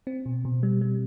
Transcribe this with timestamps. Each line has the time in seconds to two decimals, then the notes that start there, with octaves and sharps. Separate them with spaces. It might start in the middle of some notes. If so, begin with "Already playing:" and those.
0.07 C4
0.26 B2
0.45 B2
0.63 G3
0.81 G3